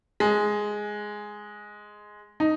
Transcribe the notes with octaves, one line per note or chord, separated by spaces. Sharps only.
G#3
D#4